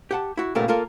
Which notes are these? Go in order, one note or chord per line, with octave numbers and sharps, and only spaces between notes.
G4 F#5 A5
E4 F#4
A#2 C#3 G3 A3 B3 A#4
A#3 F4 A4 A#4